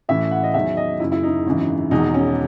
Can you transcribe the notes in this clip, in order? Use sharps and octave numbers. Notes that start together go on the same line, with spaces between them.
A1 A2 E3 E5
F#5
D#5
E2 D#3 F#3 E5
D#5
F#1 F#2 C#3 E4
E4
D#4
G#1 F#2 C#3 E3
E1 E2 D#3 D#4
C#4